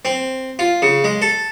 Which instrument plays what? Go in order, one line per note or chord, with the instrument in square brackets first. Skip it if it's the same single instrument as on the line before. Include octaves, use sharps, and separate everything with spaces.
[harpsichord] C4
F4
C#3
G#3
A4